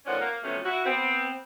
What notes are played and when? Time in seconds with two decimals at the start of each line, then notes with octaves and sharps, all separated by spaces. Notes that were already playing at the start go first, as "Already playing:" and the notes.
0.06 A2 D#3 F3 C#4 D5 F#5
0.21 A#3
0.43 C3 F3 F#3 A3 B3 C#4
0.64 E4 F#4
0.86 B3 C4